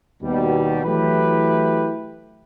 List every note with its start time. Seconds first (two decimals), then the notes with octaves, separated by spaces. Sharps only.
0.23 D#2 B2 G3
0.85 E3 F#3 A3 E4 G4 B4